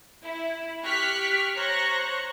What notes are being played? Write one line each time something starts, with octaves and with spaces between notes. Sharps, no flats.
E4
G4 C#6 F6 F#6 B6
C5 C#5 A#5 C#6 F#6 A#6